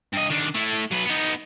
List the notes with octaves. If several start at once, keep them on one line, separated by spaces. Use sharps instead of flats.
G2 D#5
D#3 D4
A3 E4
F#3 B4
B3 D#4